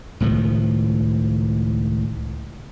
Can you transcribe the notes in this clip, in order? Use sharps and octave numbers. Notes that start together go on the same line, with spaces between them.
C#2 A2 D#3 F3